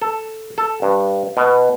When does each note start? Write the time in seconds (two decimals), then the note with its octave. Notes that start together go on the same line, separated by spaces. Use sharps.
0.02 A4
0.58 A4
0.82 G2
1.37 B2